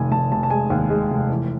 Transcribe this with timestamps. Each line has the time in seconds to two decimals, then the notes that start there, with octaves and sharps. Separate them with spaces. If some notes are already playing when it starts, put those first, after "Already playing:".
Already playing: F1 D#3 G#5
0.11 F1 A5
0.32 F1 A5
0.43 A5
0.50 G#3 G#5
0.70 D#2
0.90 G#3
1.11 F1
1.30 E3